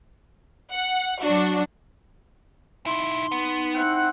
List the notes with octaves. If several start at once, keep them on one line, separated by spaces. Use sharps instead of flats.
F#5
F#3 D4 F#4
B1 D#4 E4 C6
B3
C4 E4 F#5